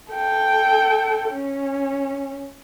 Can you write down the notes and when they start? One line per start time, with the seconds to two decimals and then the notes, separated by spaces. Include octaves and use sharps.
0.12 A4 G5
1.31 C#4